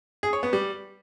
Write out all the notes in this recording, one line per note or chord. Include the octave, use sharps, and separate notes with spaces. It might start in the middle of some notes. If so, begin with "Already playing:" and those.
G#4
C#5
B3
G3